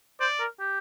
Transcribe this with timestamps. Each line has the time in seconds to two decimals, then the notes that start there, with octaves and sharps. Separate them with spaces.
0.20 C5 D5
0.40 A#4
0.60 G4